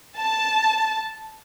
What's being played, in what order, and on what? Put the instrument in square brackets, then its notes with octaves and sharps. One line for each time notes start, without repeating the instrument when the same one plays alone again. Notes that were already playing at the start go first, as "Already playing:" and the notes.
[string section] A5